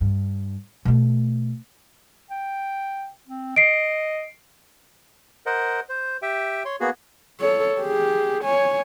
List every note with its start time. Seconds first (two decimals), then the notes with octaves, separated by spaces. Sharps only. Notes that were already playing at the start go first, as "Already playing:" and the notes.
0.01 G2
0.85 B2 A3
2.30 G5
3.27 C4
3.56 D#5 C7 D7
5.46 A#4 C5 D#5 F#5
5.89 C5
6.22 G4 E5 G5
6.65 C#5 C6
6.80 A#3 B3 F#4 G#4
7.40 A4 C#5
7.81 G4 G#4
8.44 C#5 G#5